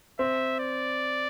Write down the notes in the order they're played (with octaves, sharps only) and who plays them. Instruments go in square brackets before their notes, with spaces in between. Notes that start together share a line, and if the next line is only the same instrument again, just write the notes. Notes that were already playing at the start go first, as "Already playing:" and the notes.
[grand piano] C4 [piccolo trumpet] E5
[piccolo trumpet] D5